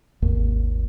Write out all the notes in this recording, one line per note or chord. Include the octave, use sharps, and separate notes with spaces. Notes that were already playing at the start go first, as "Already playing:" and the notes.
G#1 D#2